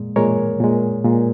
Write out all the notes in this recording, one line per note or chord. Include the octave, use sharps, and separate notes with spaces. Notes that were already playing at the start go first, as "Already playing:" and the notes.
Already playing: A#2 G#3
A#2 G#3 A#4 C#5
A#2 G#3
A#2 G#3